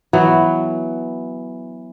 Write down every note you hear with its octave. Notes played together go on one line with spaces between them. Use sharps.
E3 F#3 B3